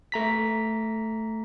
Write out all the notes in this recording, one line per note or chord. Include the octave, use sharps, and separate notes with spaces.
A3 A#5 B6